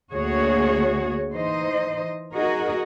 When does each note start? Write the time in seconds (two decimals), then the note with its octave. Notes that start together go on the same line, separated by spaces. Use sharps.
0.12 D2 A#3 F#4 G#4 C#5
1.32 E3 D#4 C5 D#5
2.35 D#4 F#4 G#4 A#4 D#5